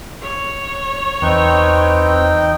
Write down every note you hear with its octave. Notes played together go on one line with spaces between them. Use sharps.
C#5
E2 C4 D#4 B4 G5